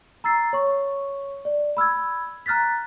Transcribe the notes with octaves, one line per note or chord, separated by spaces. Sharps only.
A#5 E6 A6 C7
C#5 C#6
D5
B5 E6 F6 G#6
A#5 F6 F#6 A6 B6